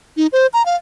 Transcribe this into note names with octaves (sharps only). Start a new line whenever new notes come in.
D#4
C5
A#5
F5